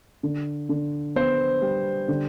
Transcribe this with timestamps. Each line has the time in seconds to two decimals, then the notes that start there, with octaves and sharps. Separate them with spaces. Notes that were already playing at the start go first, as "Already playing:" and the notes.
0.23 D3
0.69 D3
1.16 B3 C5
1.62 G3
2.08 D3